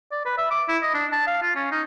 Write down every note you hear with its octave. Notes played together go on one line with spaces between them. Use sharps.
D5
B4
E5
D6
E4
D#5
D4
A5
F5
F4
C#4
D#4